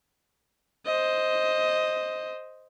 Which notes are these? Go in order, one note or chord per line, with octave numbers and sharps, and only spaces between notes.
C5 D#5